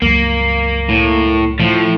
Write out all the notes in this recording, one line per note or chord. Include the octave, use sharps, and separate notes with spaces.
C#2 G2 F#3 A#3
A2
A2 F3